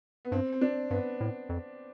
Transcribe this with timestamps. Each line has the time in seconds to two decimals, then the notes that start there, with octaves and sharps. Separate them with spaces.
0.25 B3
0.32 G2 C4
0.52 C4
0.61 D4
0.91 G2 B3
1.20 A2
1.49 F2